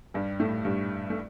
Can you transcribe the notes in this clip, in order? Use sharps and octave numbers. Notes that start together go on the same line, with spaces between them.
G2 G3
A2 A3
G2 G3
A3